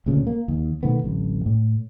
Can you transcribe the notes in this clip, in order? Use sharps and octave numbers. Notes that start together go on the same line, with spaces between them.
D2 G2 A#2 C#3
A#3
D#2
B2 D#3 A3 B3
D1 A1
A2